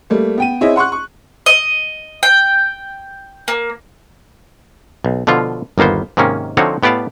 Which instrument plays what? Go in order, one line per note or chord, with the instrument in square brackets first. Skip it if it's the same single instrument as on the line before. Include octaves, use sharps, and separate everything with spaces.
[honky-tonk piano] G3 A3 A#3
B3 G5 D#7
C4 E4 G#4 C#5 D#5 E5
F#5 C6 C#6 F#6
C#6
[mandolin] D#5
G5
A#3
[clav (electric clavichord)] B1
B2 D3 F3 F4
G1 D#2 A#3 B3 C5
G#2 C3 D#3 A#3 C#4
D3 F3 C4 D#4 F#4 C#5
A2 B3 G4 D5 F5 A5